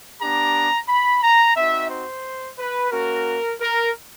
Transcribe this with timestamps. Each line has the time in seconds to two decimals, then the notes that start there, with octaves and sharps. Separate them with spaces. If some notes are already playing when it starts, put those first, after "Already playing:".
0.21 B3 D4 G4 A#5
0.88 B5
1.23 A#5
1.56 C4 D#4 F#4 E5
1.91 C5
2.59 B4
2.91 A#3 C#4 F#4 A#4
3.60 A#4